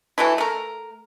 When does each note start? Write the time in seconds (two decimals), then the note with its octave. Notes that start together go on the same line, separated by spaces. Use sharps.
0.18 E3 F#3 A3 E4
0.38 A3 A#4